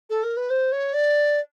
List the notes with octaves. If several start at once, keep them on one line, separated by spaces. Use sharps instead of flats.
A4
A#4
B4
C5
C#5
D5